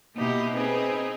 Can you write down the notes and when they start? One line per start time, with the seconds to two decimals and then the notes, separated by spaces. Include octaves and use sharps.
0.15 B2 A#3 D#4 E4 G4
0.54 C4 D#4 G#4 B4